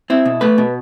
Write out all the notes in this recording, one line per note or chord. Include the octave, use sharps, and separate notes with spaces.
C4 E4
B2
A3 B4
B2